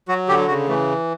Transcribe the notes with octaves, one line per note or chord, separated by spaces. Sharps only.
F#3 F#4
D3 G4
C#3 F#4
E3 A3